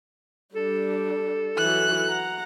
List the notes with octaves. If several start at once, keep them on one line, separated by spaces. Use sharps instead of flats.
G3 D4 A4
E3 F#3 F#6
F#5 A#5